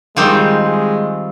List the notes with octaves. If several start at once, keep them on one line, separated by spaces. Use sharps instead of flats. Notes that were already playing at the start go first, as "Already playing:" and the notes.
D#3 G3 G#3 C4 F4
G#3